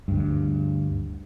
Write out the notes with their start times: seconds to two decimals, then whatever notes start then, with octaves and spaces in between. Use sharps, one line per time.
0.08 D2 G2